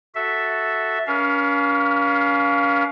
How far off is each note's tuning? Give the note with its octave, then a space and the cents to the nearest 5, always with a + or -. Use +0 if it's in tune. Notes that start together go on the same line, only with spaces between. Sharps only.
F#4 +0 A4 +0 E5 -5
C#4 +35 A#4 +45 F5 +0